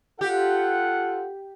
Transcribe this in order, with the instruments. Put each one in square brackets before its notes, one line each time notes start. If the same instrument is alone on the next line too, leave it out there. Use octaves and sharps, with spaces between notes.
[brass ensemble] F4 A4 F#5 [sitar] G4